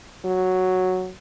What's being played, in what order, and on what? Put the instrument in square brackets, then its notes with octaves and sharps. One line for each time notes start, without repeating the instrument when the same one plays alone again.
[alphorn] F#3